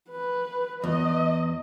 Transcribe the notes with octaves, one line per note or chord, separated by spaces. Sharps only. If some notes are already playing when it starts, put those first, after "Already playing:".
B4
E2 D#5